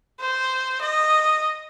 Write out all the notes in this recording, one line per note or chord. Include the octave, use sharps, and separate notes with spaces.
C5
D#5